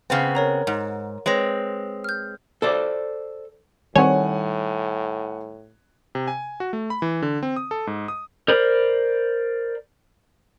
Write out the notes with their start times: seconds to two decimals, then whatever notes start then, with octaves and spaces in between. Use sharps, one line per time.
0.10 C#3 B3 C4
0.35 A#4 C#5 A#5
0.67 G#2
1.26 G#3 C4 B4 C#5 A#6
2.04 F6 G6
2.62 A4 C5 D5
3.95 A2 D#3 G3 C4 C#5 F#5 G#5
6.15 C3
6.28 G#5
6.60 F#4
6.73 A3
6.90 B5
7.02 E3
7.22 D3
7.43 C4
7.56 D#6
7.71 A4
7.87 G#2
8.08 D#6
8.48 A#4 C5 D5 B5